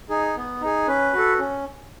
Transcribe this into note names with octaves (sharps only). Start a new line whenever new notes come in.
D#4 G#4
B3
D#4 G#4
C#4 B4
F#4 A4
C#4